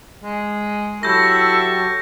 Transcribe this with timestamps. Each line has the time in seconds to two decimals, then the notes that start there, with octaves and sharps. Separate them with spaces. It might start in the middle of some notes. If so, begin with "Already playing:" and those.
0.24 G#3
1.03 F#3 E4 G4 A4 C#6 G6 A#6